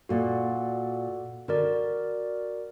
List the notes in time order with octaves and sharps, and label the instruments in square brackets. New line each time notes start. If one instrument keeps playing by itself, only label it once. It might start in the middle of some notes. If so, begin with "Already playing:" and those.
[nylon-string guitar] A#2 [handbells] F#4 A4 D5 F#5
[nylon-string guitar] D3 [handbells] F#4 A#4 D5